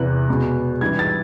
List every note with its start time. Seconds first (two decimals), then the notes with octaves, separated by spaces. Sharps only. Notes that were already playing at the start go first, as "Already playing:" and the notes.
Already playing: E2 C3 E3 F#6
0.29 B2 G#3
0.81 G#2 E3 G3 G#6
0.99 A6